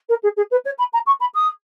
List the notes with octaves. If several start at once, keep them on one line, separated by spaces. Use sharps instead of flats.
A#4
G#4
G#4
B4
C#5
B5
A#5
C#6
B5
D#6